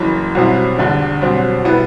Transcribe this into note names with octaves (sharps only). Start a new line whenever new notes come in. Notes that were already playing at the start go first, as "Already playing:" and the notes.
Already playing: F#1 F#2 E3
C2 B2 F#3 C4 E4
E2 D3 G3 D4
C2 B2 F#3 C4
B2 G3 B3 E4